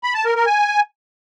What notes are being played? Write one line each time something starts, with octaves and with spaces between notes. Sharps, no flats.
B5
A5
A#4
A#4
G#5